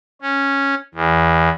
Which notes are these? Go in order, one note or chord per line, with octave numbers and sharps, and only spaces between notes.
C#4
E2